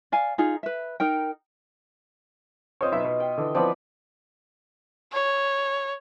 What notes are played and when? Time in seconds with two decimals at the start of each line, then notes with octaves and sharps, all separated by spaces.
0.12 D5 F5 G#5
0.38 D#4 F4 G#4
0.63 B4 E5
1.00 D#4 A#4 G5
2.81 C4 F4 C5 C#5 D#5 F5
2.92 B1 E5
3.04 B2
3.20 G5
3.38 D3 E3
3.55 E3 F3 B3 C4 D5 B5
5.13 C#5